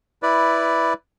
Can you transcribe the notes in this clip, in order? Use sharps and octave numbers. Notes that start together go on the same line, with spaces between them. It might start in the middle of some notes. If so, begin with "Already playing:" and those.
E4 B4 D5